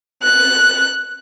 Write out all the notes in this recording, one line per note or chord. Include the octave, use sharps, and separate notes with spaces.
F#6